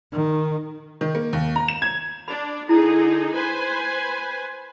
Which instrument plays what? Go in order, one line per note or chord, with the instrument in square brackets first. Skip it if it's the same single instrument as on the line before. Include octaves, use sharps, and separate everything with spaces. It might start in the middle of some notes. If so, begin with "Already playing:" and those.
[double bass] D#3
[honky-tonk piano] D#3
A#3
D#2
A#5
E7
G#6
[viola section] D4 [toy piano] B5
[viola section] D3 D#4 G#4 [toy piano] E4 A#5
[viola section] B4 C5 G#5